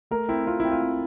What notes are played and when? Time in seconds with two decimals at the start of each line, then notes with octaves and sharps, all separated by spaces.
0.11 A3 A#4
0.29 C4 E4
0.47 C4 F4
0.60 C4 E4
0.72 F4
0.82 C4